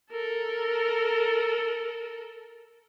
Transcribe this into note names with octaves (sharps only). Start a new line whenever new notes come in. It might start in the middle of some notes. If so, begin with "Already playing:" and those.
A4 A#4